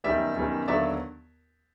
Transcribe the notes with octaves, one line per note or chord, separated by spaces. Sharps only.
F#2 D#3 G3 B3 D5 E5
F#2 D#3 G3 B3
D#2 D3 F#3 B3 D5 E5